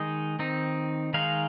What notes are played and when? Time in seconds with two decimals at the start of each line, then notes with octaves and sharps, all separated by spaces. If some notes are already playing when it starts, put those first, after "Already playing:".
Already playing: D#3 G#3 D#4 D#5
0.39 D#3 C4 D#4
1.13 D#3 G#3 D#4 F5